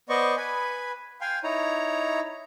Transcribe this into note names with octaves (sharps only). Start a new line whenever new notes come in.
B3 C5 D5 D#5 C#6
B4 G#5 B5
F5 G5 G#5 C6
D#4 E4 C#5 A#5